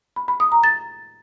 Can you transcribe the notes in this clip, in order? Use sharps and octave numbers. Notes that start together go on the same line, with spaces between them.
B5
B5
D#6
A#5
A6